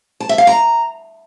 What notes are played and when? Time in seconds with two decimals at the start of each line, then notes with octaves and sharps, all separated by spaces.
0.20 A5
0.29 E5
0.38 F5
0.47 A#5